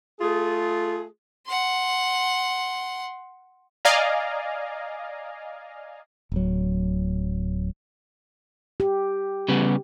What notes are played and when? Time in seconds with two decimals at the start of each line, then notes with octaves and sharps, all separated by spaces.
0.20 A3 F4 G#4
1.47 F#5 C6
3.85 D5 D#5 F5 G#5 A#5
6.32 D1 F#3
8.80 G4
9.48 C#3 G3 B3